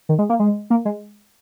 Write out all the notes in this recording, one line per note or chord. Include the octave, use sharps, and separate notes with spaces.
D#3
G#3
A#3
G#3
A#3
G#3